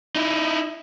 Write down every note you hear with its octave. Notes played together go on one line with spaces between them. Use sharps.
D#4 E4